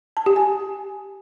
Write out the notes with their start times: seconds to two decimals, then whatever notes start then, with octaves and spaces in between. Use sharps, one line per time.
0.17 A5
0.26 G4
0.36 G#5